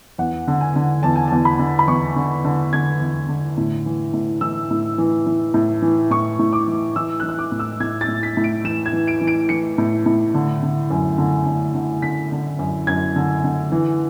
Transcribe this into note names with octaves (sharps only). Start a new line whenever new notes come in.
E2 F#5
D3
G#5
D3
E2 A5
G#5
E2 A5
B5
D3
B5
E2 C#6
D3
D3
D3 G#6
E2
D3
A2
E3
A2
E3 E6
A2
E3
E3
A2
E3
A2 C#6
A2
D6
E3
E3 E6
E3 F#6
E6
D6
A2
E6
A2 G#6
A6
A2
B6
A2
D7
E3 E7
G#6
E3
D7
E3
D7
E3 C#7
A2
A2
D3
D3
F#2
D3
D3
D3
D3 B6
D3
F#2
F#2 G#6
D3
D3
E3